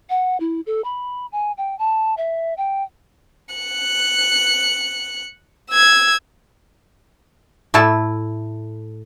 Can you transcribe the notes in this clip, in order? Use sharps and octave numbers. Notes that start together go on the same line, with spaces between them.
F#5
E4
A4
B5
G#5
G5
A5
E5
G5
F#6 C#7
E6 G#6
A2 A3 E4 A4 A5